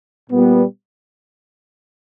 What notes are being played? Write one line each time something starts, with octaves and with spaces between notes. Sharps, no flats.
A#2 G3 B3